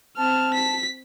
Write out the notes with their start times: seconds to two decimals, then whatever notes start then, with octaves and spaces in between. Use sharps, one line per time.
0.17 C4 A5 F6
0.54 B6